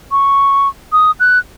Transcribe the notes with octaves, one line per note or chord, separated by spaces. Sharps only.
C#6
D#6
F#6